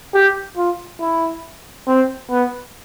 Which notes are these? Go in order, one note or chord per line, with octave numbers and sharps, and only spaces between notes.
G4
F4
E4
C4
B3